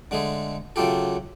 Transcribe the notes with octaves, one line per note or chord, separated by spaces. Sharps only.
D3 G#3 A3 G#4
C#3 F#3 A3 F4 G4 A4